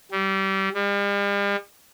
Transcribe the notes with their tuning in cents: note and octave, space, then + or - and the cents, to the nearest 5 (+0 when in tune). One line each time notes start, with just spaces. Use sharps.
G3 -25
G3 +45